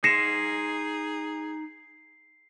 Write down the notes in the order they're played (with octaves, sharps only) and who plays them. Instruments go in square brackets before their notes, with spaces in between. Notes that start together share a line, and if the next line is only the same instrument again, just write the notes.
[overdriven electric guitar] D#4 C6 [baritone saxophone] G#4 [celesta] A#6 C#7 E7 [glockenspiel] C7